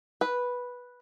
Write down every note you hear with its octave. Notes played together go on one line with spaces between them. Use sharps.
B4